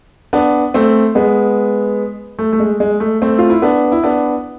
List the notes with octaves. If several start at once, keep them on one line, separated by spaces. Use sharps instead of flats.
B3 D4
A3 C4
G#3 B3
A3
A3
G#3
G#3
A3
A3 C4
F4
E4
B3 D4
E4
B3 D4